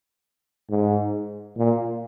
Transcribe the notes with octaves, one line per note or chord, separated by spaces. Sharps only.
G#2
A#2